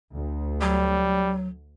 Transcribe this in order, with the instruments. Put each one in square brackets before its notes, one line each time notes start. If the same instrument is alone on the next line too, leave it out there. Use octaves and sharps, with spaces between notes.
[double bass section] D2
[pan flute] F#3 [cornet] G3